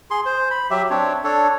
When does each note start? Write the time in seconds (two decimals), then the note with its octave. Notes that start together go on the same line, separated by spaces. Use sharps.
0.11 G#4 C6
0.26 C5
0.51 B5
0.70 F#3 G4 E5
0.90 C4 D4 C#5
1.24 D4 A4 C#5